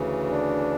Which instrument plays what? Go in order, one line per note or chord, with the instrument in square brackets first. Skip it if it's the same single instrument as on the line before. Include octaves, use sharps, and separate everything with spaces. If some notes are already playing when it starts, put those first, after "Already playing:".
Already playing: [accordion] D2 C#3 E3
[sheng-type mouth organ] D4